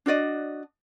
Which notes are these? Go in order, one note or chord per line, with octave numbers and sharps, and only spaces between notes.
D4 F#4 D5 D#5